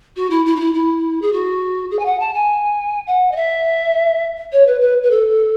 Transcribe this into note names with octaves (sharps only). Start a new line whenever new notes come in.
F#4
E4
E4
D#4
E4
E4
G#4
F#4
G#4
G#5
F#5
A5
G#5
F#5
D#5
E5
C#5
B4
B4
B4
A4